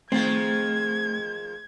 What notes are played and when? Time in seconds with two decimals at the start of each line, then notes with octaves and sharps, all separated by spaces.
0.12 D#3 F3 G#3 A3 C4 G#6